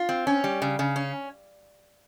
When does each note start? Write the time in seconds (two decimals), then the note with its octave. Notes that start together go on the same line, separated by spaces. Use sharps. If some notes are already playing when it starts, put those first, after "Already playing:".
Already playing: F4
0.09 C4
0.27 C#4
0.44 G3
0.62 C#3
0.79 C#3
0.96 C#4